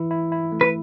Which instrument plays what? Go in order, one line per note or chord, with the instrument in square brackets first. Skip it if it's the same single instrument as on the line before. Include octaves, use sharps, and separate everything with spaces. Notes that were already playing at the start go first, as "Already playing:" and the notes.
Already playing: [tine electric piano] E3 E4
E4
E4
A3
[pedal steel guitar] B4